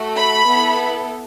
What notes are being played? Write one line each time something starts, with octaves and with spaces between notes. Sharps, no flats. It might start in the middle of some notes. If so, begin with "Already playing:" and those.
Already playing: A3 F#4 A4
B5
B3 E4 A4